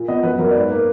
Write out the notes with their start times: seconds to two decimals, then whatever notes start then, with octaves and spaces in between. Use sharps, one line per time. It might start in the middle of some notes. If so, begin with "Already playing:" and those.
Already playing: A#2
0.08 B3 D#5
0.23 F#2 B4
0.39 F#3 A#4
0.51 D5
0.55 G#2 B4
0.71 A#3